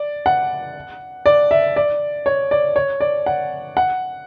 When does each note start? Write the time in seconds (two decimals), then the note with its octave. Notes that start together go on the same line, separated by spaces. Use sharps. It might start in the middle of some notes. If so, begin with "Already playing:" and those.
Already playing: D5
0.26 F#5
1.26 D5
1.51 E5
1.76 D5
2.26 C#5
2.51 D5
2.76 C#5
3.00 D5
3.26 F#5
3.77 F#5